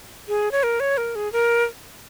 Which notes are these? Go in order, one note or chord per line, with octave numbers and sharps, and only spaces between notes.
G#4
C#5
A#4
C#5
A#4
G#4
A#4